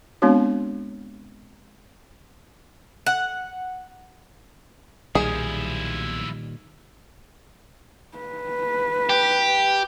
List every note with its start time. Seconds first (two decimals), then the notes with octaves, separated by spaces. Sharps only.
0.22 G#3 B3 C4 D4 F#4 C#5
3.06 F#5
5.15 B1 A#2 D#3 F3 G3 E4 G#4
8.18 B4
9.09 G4